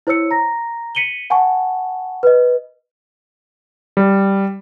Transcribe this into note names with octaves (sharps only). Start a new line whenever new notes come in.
E4 C5 C#5 E6 C#7
A#5 A#6
B6 C#7 D#7 F#7 G7
F#5 G#5 A5 C#6
B4 D#5
G3